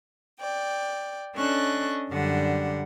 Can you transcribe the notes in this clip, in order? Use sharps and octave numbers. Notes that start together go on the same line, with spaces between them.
D5 G5
C#4 D4 A4 D#5 C#6 F#6
F#2 D3 G3 D4 F#5